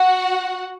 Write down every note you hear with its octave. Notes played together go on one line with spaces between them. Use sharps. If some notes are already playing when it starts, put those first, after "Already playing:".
Already playing: F#4 F#5